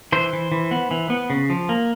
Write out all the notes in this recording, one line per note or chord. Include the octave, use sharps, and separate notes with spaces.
E3 C5
E3
E3
B3
E3
B3
C#3
F3
A#3